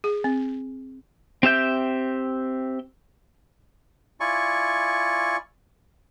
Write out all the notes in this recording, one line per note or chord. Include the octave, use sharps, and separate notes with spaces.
G#4
C4
C4 G4 E5 G6
E4 F4 D5 G#5 C#6